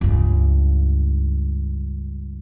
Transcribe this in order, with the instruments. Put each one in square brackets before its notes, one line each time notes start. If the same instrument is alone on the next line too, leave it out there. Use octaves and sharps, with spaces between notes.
[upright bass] C#2 G2